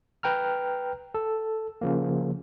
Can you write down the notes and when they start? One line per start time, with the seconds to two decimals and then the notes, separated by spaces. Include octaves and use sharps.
0.23 B4 G5 A#5 F6
1.14 A4
1.81 C#3 F3 A#3